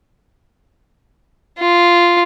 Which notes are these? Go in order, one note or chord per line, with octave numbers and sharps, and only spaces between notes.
F4